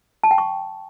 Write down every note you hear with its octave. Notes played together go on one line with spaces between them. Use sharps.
A5
G5
C#6